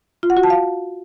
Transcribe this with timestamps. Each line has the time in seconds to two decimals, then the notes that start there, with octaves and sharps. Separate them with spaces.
0.23 F4
0.30 F#5
0.37 F#4
0.43 A5
0.50 F5